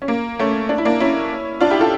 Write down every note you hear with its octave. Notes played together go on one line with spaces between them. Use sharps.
C#4
A#3
A3 C#4
D4
E4
A#3 D4
C#4 E4
D4 F4
E4 G4
F4 A4